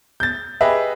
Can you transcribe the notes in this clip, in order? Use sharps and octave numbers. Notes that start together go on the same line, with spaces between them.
G6 A6
G4 G#4 B4 D#5 E5